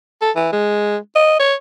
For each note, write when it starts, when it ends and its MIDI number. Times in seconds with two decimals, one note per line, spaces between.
0.22 0.31 69
0.36 0.49 52
0.52 0.97 56
1.16 1.37 75
1.40 1.55 73